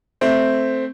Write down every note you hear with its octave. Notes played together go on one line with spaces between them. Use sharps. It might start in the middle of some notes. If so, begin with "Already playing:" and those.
A3 C4